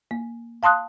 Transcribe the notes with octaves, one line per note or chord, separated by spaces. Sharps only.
A#3
F5 A5 C6 D#6 F#6